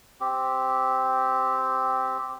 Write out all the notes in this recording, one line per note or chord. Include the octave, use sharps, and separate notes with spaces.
C4 G4